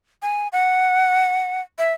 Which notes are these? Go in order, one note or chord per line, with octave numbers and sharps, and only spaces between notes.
G#5
F#5
E5